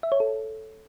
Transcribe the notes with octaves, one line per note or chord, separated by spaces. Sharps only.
E5
C#5
A4